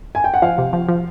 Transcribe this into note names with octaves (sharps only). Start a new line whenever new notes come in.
G#5
G5
F#5
F3 F5
C3
F3
F3